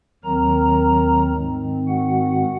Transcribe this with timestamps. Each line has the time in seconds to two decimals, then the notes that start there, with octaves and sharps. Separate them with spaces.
0.24 D#2 D#3 F#3 C4 A#4 A#5
1.34 G#2 D#3 G#3 C4
1.88 F#4 F#5